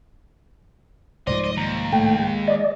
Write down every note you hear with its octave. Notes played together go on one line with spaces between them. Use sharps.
C2 G#2 F3 C5 D5 D#5
D#5
D#2 A#5
A2 A3 G5
G#3
D5 D#5